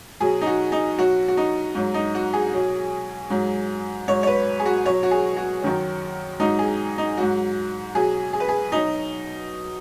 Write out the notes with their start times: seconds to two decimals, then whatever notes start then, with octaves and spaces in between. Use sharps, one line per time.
0.20 B2 F#3 G#4
0.41 D#4
0.46 F#4
0.72 D#4
0.97 B2 F#3 F#4
1.28 F#4
1.37 D#4
1.75 G#2 F#3
1.94 D#4
2.15 F#4
2.33 G#4
2.53 B2 F#3
3.30 G#2 F#3
4.08 G#2 F#3 C#5
4.23 C#5
4.27 B4
4.60 G#4
4.66 F#4
4.85 B2 F#3 C#5
5.03 F#4
5.11 G#4
5.37 F#4
5.62 F#2 D#3 F#3
6.40 G#2 F#3 D#4
6.59 G#4
6.98 D#4
7.17 G#2 F#3 F#4
7.94 B2 F#3 G#4
8.33 G#4
8.40 B4
8.49 G#4
8.72 B2 F#3 D#4